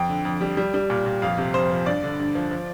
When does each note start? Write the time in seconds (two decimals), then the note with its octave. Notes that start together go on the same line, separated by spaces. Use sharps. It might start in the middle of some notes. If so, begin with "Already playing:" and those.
Already playing: F2 G5
0.09 D3
0.25 F2
0.41 G3
0.57 G3
0.74 G3
0.90 A#2
1.06 A#2
1.22 F2 F5
1.38 C3
1.54 F2 C5
1.71 F3
1.86 G2 D5
2.04 D3
2.20 G2
2.35 F3
2.51 F3